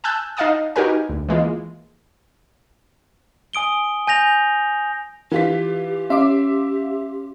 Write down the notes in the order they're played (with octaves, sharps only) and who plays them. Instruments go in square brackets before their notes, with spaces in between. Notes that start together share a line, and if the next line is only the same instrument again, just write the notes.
[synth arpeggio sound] G#5 A5 E6 F#6 G6
D#4 D#5 F5 F#5 A5 D#6
D#4 F#4 G4 A#4 B4 G#5
D2
E3 G#3 A#3 F4
[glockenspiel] G#5 D#6 D7 G7
G#5 G6 A#6 F7
[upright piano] E3 F4 B6 [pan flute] G4
[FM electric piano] C#4 F5 C6 [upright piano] E5 D6